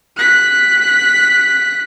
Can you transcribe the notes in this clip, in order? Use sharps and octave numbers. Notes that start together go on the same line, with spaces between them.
F#6 B6